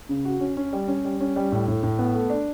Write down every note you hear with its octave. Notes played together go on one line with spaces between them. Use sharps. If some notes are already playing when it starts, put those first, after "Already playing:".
C#3
F#4
C#4
C#4
G3
C#4
G3
C#4
G3
A2
A2
A2
B3
A3
D4